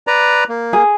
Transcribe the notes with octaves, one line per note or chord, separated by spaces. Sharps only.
B4 D5 A#5
A#3
G#4